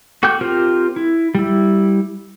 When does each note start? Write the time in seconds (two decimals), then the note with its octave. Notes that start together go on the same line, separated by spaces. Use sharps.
0.23 F#4 A4 G5 D6 G6
0.41 C4 F4 G4 A#4 C5
0.96 E4
1.35 G3 E4